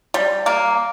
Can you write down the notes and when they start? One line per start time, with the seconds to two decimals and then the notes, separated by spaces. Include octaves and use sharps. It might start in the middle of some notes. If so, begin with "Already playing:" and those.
0.14 G3
0.46 A#3